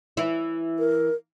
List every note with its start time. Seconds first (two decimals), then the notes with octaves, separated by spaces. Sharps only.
0.17 E3 E4
0.79 A#4